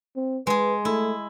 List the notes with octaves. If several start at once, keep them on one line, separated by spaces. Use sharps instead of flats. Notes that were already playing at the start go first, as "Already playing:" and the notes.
C4
G#3 G#4 B4
A3 E4